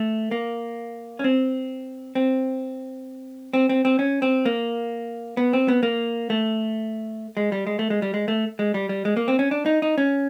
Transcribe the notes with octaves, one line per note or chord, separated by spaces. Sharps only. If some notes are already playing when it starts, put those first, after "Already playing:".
Already playing: A3
A#3
C#4
C4
C4
C4
C4
C4
C#4
C4
A#3
B3
C4
B3
A#3
A3
G#3
G3
G#3
A3
G#3
G3
G#3
A3
G#3
G3
G3
G#3
A#3
C4
C#4
D4
D#4
D#4
C#4